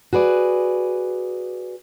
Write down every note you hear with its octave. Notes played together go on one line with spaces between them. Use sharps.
F#4 G#4 B4 D5